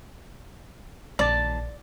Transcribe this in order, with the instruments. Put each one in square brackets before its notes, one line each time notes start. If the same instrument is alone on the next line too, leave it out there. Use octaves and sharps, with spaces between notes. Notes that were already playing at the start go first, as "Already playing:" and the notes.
[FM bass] A#1 [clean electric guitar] D#2 A5 [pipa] D5